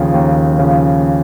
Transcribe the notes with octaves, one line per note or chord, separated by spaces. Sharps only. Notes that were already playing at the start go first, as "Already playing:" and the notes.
Already playing: D#2 C#3 F3
D#2
C#3 F3